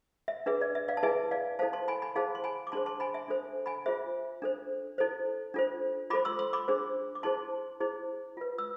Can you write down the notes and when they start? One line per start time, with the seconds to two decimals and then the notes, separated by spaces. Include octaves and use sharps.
0.28 E5
0.46 D4 G#4 B4 E5
0.61 D5
0.75 E5
0.88 D5 F5
0.97 A5
1.03 E4 G#4 B4 E5 G#5
1.31 D5 F5
1.59 E4 A4 C5 F5 A5
1.73 A5 C6
1.88 G#5 B5
2.02 G#5 B5
2.16 E4 G#4 C5 F5 A5
2.35 C6
2.44 G#5 B5
2.67 D6
2.72 D4 G#4 C5 A5 C6
2.86 A5 C6
3.00 G#5 B5
3.14 E5 G#5
3.28 D4 A4 C5
3.66 G#5 B5
3.86 F4 G#4 C5 E5
4.42 D4 A4 C5
4.98 E4 A4 C5
5.54 D4 F4 A4 C5
6.10 F4 A4 C5 B5 D6
6.25 C6 E6
6.39 C6 E6
6.53 B5 D6
6.68 D4 G#4 C5
7.15 D6
7.23 E4 G#4 C5 A5 C6
7.80 E4 G#4 C5
8.37 F4 B4
8.58 E6